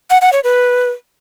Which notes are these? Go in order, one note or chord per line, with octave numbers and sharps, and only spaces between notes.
F#5
F#5
C#5
B4